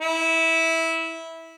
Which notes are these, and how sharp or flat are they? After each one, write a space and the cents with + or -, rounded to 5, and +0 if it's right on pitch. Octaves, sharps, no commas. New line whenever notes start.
E4 -15